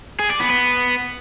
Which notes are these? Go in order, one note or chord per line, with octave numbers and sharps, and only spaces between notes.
G#4
D5
B3
B3